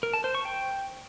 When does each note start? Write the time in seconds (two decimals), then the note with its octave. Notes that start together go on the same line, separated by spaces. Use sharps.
0.03 A#4
0.14 A5
0.24 C5
0.35 C#6
0.45 G5